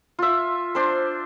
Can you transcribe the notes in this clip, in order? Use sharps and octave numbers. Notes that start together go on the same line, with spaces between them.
F4 E5
D4 C5